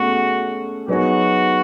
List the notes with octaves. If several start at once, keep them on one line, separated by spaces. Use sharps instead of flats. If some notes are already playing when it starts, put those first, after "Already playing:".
Already playing: B2 A3 C#4 F#4 G#4
F#3 B3 D#4 F#4 G#4 C#5